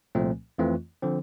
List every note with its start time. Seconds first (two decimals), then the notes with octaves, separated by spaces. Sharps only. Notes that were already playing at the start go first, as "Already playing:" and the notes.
0.15 C2 A#2 F3 A3 C4
0.58 F2 E3 A3 C4 F4
1.02 D3 F3 C4